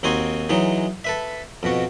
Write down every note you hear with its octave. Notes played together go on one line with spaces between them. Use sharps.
D#2 C4 D#4 F#4 G#5 C6
E3 F#3 G#3 D#4
A4 B4 E5
F2 B2 F#4